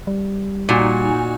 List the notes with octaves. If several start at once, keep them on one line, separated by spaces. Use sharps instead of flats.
G3
A#2 D#4 F#4 G#5